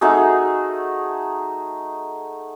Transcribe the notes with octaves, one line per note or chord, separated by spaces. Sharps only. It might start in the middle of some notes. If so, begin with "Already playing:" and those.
A3 D#4 F#4 G#4